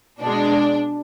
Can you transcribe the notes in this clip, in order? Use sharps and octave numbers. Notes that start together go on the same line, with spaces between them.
B2 G#3 D4